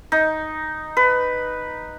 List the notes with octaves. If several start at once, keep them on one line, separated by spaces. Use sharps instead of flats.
D#4
B4